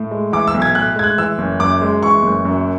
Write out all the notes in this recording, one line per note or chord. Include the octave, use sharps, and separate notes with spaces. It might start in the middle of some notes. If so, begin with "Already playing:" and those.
Already playing: A2
G#3
E3 D6
E6
B1
G#6
A2 F#6
G#3 G#6
F#6
E3 E6
F#1
F#2 D6
G#3
E3 C#6
F#1
F#2